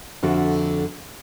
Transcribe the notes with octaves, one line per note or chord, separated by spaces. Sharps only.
F2 D3 F#4 E5